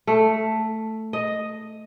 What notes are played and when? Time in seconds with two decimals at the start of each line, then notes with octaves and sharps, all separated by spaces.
0.07 A3
1.13 D#5